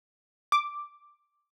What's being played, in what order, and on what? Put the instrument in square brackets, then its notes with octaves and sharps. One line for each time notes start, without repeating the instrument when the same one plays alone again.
[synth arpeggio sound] D6